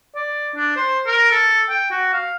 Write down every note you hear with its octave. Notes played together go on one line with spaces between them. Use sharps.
D5
D4
C5
A#4
A4
G5
F#4
F5